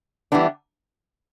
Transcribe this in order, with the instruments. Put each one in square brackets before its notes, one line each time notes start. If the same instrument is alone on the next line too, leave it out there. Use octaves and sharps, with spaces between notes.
[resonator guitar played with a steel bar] E3 G3 B3 D4